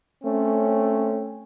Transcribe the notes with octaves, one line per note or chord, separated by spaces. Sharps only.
A3 C4 C#4